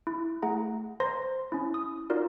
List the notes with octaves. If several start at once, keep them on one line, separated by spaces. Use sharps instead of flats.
E4
A3 G#4 F#5 A#5
B4 C5 A#5 C6 A#6
C#4 E4
D#6
D#4 F4 F#4 A#4 D5